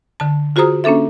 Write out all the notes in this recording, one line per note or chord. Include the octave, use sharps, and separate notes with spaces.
D3 A5
F4 F#4 G#4 C5 A#5 D#6
A#3 C#4 D4 A4 E5